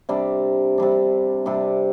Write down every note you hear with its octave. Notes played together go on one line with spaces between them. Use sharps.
C3 G3 D4
C3 G3 D4
C3 G3 D4